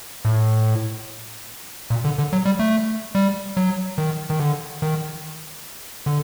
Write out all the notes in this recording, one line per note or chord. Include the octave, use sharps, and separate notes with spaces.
A2
A#2
D3
D3
F#3
G3
A3
G3
F#3
D#3
D#3
D3
D#3
D3